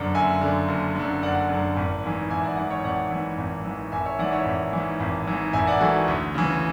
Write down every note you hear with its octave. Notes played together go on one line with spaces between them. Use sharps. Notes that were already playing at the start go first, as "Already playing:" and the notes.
Already playing: F#1 F#2 D3 D5 F#5
F#1 E5 G#5
F#2 D3
F#1
F#2 D3
F#1 D5 F#5
F#2 D3
G#1
G#2 E3
G#1 E5 G#5
D5 F#5
G#2 E3 D5 F#5
C#5 E5
G#1 D5 F#5
G#2 E3
G#1
G#2 E3
G#1 E5 G#5
C#5 E5
G#2 E3 D5 F#5
C#5 E5
G#1
G#2 E3
G#1
G#2 E3
G#1 E5 G#5
D5 F#5
G#2 E3 F#4 A4
D2
C#3 E3